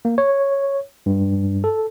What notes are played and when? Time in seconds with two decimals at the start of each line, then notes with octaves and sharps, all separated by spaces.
0.05 A#3
0.18 C#5
1.06 G2
1.64 A4